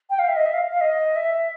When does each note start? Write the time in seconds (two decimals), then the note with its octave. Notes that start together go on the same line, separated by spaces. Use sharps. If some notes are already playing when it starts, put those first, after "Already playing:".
0.10 G5
0.19 F5
0.28 E5
0.36 D#5
0.46 E5
0.53 F5
0.71 F5
0.81 D#5
1.16 E5